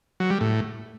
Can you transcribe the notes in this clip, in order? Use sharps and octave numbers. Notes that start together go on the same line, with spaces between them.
F#3
G3
A2